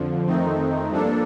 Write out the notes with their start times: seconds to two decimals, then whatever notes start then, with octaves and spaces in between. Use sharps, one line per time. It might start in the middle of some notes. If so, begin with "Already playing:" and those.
Already playing: F2 D3 F3
0.27 F2 D#3 A3 C4 D#4
0.90 G2 F3 A#3 D4 A4